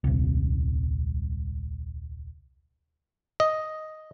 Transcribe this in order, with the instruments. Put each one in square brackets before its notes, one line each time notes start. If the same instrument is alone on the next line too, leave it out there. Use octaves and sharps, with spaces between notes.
[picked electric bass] D#1 C2
[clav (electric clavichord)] D#5